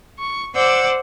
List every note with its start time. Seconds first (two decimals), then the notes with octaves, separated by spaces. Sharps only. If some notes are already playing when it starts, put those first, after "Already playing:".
0.19 C#6
0.54 C5 D5 F#5 D6 E6 G6